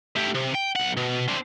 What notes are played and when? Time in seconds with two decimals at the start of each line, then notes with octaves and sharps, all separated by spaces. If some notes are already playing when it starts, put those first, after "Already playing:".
0.16 A3 G4
0.35 C3
0.55 G5
0.76 B1 F#5
0.97 B2
1.28 C4 D4